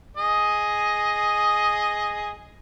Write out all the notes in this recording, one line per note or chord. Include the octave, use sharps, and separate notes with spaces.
G#4 D#5